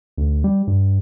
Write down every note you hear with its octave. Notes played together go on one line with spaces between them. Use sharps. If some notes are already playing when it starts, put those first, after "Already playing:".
D2
G3
G2